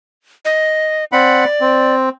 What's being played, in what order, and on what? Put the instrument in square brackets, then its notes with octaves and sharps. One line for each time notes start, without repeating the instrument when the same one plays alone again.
[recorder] D#5
[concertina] C4 F#5 B5 [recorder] D5
[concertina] C4